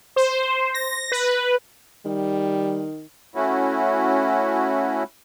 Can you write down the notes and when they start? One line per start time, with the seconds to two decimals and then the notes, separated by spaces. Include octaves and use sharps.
0.16 C5
0.74 A#6
1.12 B4
2.06 D#3 G3
3.35 A3 C#4 E4 F#4